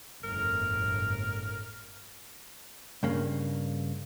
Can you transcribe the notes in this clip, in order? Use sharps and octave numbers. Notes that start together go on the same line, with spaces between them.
G1 F2 A2 A#4
G2 C#3 A#3